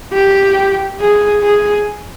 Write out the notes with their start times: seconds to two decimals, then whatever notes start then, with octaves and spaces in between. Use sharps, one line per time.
0.13 G4
1.00 G#4
1.43 G#4